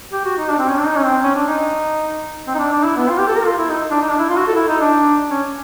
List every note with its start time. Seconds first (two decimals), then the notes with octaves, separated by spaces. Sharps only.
0.12 G4
0.25 F#4
0.38 D#4
0.50 D4
0.59 C4
0.69 C#4
0.77 D4
0.87 D#4
0.96 C#4
1.05 C4
1.23 C#4
1.36 D4
1.48 D#4
2.47 C4
2.55 D#4
2.59 D4
2.72 D4
2.84 E4
2.97 B3
3.09 F4
3.18 G4
3.28 A4
3.36 A#4
3.45 F4
3.58 E4
3.70 D#4
3.91 D4
4.01 D#4
4.11 D4
4.19 E4
4.29 F4
4.37 F#4
4.47 A4
4.56 E4
4.68 D#4
4.81 D4
5.30 C#4